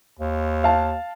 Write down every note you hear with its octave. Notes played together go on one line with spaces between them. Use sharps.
D#2
F5 A5